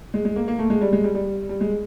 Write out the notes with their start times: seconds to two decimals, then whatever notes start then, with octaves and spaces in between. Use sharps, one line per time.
0.14 G#3
0.25 G#3
0.36 A#3
0.48 A#3
0.59 A3
0.70 G#3
0.81 G3
0.93 G#3
1.04 G3
1.15 G3
1.49 G3
1.61 G#3